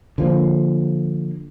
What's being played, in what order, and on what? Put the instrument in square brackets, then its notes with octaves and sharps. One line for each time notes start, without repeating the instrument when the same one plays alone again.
[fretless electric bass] D3 F3 A#3